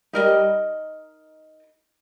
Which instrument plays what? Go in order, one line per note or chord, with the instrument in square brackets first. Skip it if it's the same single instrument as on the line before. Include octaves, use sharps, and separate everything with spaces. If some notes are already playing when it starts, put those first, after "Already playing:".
[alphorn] G3 [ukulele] D#4 A#4 D#5